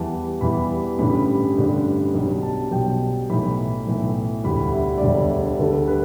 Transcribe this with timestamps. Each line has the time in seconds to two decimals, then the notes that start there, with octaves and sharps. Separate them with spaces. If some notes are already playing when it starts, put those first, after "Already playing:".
Already playing: E2 E3 G3 A5
0.41 E2 E3 G3 B5
0.98 A1 G2 D3 G3 B5
1.57 A1 G2 D3 G3
2.14 B1 B2 G3
2.42 A5
2.71 B1 B2 G3 G5
3.30 B1 A2 E3 B5
3.87 B1 A2 E3
4.44 E1 D2 D3 G3 B5
4.73 E5
4.97 D5
5.02 E1 D2 D3 G3 E5
5.60 D2 D3 G3 A4
5.87 B4